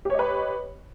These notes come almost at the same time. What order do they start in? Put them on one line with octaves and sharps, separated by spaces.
G4 C#5 D#5 B4